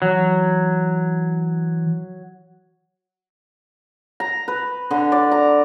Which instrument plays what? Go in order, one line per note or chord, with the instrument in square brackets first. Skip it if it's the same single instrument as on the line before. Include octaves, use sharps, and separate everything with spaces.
[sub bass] E3 [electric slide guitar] F#3
[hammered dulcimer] A#5
B4
D3
D5
A#5